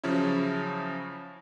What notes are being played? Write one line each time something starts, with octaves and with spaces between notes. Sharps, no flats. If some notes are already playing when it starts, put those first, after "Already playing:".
C#3 F3 F#3 C#4 E4